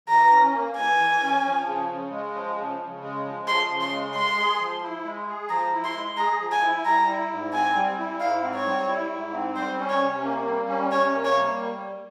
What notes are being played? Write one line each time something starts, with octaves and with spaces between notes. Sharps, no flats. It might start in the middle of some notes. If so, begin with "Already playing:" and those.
E3 A#5
C#4
A#3
E3 G#5
E3
C#4
F3
C#3
C#3
G#3
F3
C#3
C#3
G#3
F3
C#3 C6
C#3
C6
G#3
G#3 C6
G#4
F3
E4
G#3
G#4
F3 A#5
E4
C6
G#3
G#4 A#5
F3
G#5
E4
G3 A#5
E4
G#2
C4 G#5
G3
E4
G#2 F5
C4
C#5
G3
E4
G#2
C4
G3 C5
C#4
C#5
C3
A#3
G3
C#4
C3 C#5
A#3
C#5
G3